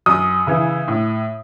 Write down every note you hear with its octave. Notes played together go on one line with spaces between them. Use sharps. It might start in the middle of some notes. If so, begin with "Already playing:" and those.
F#2 D#6
C#3 E3
A2